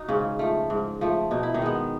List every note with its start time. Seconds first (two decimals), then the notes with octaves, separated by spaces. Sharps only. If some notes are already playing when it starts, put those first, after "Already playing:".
Already playing: D#4 F#4
0.08 G#2 C#3 C#4
0.39 F3 A3
0.70 G#2
1.01 F3 A3
1.31 B2 D#4
1.43 E4
1.54 D#3 D#4
1.62 G#3 B3